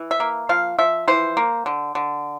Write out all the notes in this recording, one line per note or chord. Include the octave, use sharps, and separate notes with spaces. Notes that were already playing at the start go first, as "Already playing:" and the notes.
Already playing: E3
E5
A#3
F3 F5
F3 E5
E3 C5
A#3
D3
D3